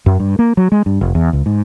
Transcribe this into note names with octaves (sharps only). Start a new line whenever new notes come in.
F#2
G2
A#3
F#3
G#3
G2
F1
E2
C#2
G#2